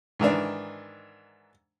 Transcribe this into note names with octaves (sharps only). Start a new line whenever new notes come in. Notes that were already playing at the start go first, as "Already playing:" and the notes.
G#2 D#3 E3 D4